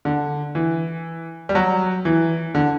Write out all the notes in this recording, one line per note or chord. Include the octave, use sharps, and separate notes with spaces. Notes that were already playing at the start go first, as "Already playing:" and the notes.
D3
E3
G3
F#3
E3
D3